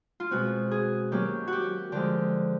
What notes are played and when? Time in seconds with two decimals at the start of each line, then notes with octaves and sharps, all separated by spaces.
0.20 F4
0.31 B2 G#3 C4 F#4
0.71 G#4
1.11 D#3 F#3 A#3 C#4 G4
1.47 F#4 G4
1.92 D3 F3 G#3 G4